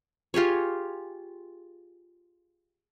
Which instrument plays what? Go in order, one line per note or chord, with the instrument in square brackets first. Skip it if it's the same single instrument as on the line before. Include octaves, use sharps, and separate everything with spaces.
[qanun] F4 G4 G#4 C#5